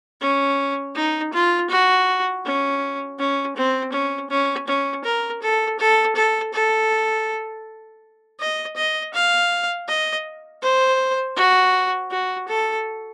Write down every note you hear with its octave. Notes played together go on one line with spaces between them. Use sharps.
C#4
D#4
F4
F#4
C#4
C#4
C4
C#4
C#4
C#4
A#4
A4
A4
A4
A4
D#5
D#5
F5
D#5
C5
F#4
F#4
A4